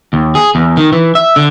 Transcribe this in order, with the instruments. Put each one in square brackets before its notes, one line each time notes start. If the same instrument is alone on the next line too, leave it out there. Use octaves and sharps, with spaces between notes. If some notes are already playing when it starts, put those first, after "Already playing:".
[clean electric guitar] D#2
G#4
E2
D#3
E3
E5
D3